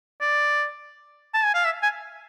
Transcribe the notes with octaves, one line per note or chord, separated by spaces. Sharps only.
D5
A5
G#5
F5
E5
G#5